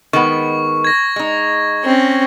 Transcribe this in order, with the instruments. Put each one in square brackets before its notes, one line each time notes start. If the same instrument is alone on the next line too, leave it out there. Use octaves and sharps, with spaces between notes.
[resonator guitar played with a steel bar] D#3 G#3 B3 [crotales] C#6
[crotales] G#6 A#6
[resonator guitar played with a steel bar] G#3 D#4
[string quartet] C4 C#4